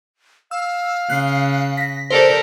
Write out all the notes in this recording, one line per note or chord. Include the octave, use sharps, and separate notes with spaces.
F5 E6
C#3 F#6 C7
A#6 B6
G4 A4 A#4 C5 D5